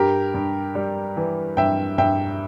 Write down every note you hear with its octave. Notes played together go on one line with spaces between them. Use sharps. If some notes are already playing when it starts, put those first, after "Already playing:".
Already playing: G2 G4 A#4
G2
G3
E3
G2 E5 G5
G2 E5 G5